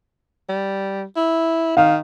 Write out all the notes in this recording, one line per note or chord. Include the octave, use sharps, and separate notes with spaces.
G3
E4
D#3 F5